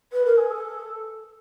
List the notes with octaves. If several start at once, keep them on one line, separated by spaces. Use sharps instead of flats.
B4
A#4
G#4
A4